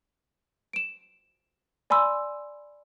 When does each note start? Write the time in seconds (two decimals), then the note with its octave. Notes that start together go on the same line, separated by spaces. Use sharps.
0.73 D7 E7
1.90 D5 G#5 B5 C6 E6